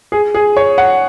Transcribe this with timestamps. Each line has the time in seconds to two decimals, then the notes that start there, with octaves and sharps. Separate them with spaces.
0.12 G#4
0.35 G#4
0.57 C#5
0.78 F#5